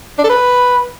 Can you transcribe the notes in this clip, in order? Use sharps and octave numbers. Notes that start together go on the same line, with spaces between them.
D4
A4
B4